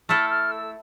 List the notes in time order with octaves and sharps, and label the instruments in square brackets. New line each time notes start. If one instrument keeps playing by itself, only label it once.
[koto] A3 E4 A4 [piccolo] F6
[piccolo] F6
E6